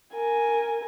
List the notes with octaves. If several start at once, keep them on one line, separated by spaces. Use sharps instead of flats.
A#4 G#5